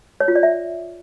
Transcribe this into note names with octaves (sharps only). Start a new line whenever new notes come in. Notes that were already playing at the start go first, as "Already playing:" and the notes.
C#5
F4
D5
E5